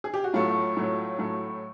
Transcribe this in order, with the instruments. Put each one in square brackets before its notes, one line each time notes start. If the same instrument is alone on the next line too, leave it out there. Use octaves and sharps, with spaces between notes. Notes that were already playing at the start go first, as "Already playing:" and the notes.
[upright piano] G#4
G4
F#4
A2 F#3 A3 F4
A2 F#3 A3
A2 F#3 A3